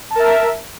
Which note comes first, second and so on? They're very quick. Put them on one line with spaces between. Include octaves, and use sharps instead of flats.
A5 A#4 E5